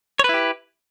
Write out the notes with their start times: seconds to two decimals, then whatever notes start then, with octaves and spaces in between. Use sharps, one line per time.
0.19 C#5
0.24 B4
0.29 E4
0.34 G4